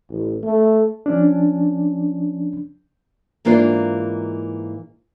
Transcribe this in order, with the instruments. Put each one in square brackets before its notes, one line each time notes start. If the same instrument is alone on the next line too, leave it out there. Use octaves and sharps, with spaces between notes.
[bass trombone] A1
A3
[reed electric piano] F3 C#4 D4
[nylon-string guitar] G#2 E3 A#3 D4 F4 C5